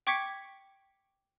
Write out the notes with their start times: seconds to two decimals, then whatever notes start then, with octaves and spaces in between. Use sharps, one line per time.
0.07 G5 C#6 D6 G#6 B6 C#7